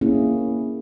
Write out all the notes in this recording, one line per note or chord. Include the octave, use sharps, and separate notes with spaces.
A#3 C#4 E4 G#4